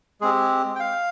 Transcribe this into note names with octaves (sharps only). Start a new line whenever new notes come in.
G#3 C4 G4 G#4
G5
F5